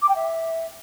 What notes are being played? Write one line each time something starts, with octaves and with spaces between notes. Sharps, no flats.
D6
G5
E5